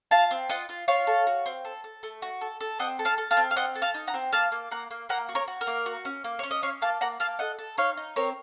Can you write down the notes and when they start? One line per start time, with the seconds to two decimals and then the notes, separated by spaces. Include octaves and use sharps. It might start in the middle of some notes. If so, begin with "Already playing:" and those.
0.11 F4 F5 A5
0.31 C4
0.49 F4 D#5 F#5
0.69 F4
0.88 F4 C#5 F5
1.07 A4
1.27 F#4
1.46 C4
1.65 A4
1.84 A4
2.03 A3
2.22 F#4
2.41 A4
2.60 A4
2.79 C4 D#5 F#5
2.99 A4
3.05 F5 A5
3.18 A4
3.31 F5 A5
3.37 C4
3.51 F5
3.56 C4 D#5 F#5
3.75 A4
3.82 F5 A5
3.94 D#4
4.07 F#5 A#5
4.14 C4
4.33 A#3 F5 A5
4.52 A#3
4.71 A#3 F#5 A#5
4.91 A#3
5.09 A#3 F#5 A#5
5.29 F#4
5.35 A#4 C#5
5.48 F#4
5.61 A#4
5.67 A#3
5.86 F#4
6.05 C#4
6.24 A#3
6.39 C#4 C#5
6.51 D#5
6.62 C#4 C#5 F5
6.82 A#3 F5 A5
7.01 A#3 F#5 A#5
7.20 A#3 F5 A5
7.39 A4 D#5 F#5
7.59 A4
7.78 D#4 C#5 F5
7.97 D#4
8.16 C4 A#4 C#5